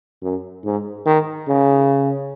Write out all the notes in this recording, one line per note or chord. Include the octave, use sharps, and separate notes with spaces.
F#2
G#2
D#3
C#3